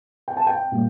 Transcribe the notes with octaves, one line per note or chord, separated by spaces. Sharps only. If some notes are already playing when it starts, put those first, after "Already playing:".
G5
A5
G5
A#2 G3 A#3